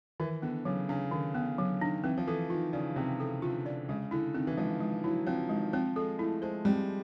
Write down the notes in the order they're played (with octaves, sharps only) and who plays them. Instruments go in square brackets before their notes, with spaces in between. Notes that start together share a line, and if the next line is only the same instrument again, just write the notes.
[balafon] D#3 [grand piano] E3
[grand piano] D3 [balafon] B3
[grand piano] C#3 [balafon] F#3
[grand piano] C#3 [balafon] D4
[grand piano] D3 [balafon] D#3
[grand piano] C#3 [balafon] B3
[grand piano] D3 [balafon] F#3
[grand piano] D#3 [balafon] D4
[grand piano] E3 [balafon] C4
[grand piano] F3
[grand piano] E3 [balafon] A4
[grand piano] D#3 [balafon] F4
[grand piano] C#3 [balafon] D5
[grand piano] C3 [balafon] C4
[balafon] A4
[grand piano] D3 [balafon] F4
[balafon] D5
[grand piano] C#3 [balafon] G#3
[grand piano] D3 [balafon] E4
[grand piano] D#3 [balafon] C4
[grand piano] E3
[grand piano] F3 [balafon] G#3
[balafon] G#3
[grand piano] F#3 [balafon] E4
[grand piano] F3 [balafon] C4
[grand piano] D#3 [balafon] G#3
[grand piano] F3 [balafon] C4
[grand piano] G#3 [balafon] A4
[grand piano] A3 [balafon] E4
[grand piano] G#3 [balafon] C5
[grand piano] G3 [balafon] C4